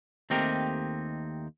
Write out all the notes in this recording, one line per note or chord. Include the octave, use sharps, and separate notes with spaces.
D#2 A3 C4 D#4 G4 A#4